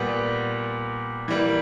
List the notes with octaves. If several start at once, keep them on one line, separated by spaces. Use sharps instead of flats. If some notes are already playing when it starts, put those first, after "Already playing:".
Already playing: A#2 G3 B3
E3 G3 A#3